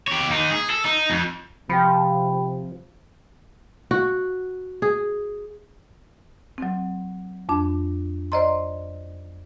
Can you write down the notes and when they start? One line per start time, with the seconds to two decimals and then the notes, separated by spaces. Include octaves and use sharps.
0.08 G4 C#5
0.28 D#2 D#4
0.51 G#4
0.70 A4
0.85 D#4
1.10 F2
1.69 C3 F3 G5 B5
3.91 F#4
4.82 G#4
6.58 F#3 C4
7.49 F2 D4
8.32 C5 D5 D#5 A#5 C6